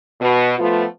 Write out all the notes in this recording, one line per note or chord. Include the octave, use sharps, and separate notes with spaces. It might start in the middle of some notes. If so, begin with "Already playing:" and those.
B2
F3 A3 B3 F4